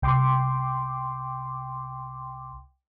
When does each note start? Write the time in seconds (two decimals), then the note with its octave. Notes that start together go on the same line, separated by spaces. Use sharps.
0.02 C2 G5 C6 D6